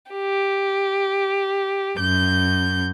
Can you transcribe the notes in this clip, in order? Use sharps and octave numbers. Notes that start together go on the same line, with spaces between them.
G4
F#2 G6